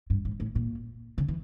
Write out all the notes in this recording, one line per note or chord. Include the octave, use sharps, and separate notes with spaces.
G2
G#2
A2
A#2
C#3
E3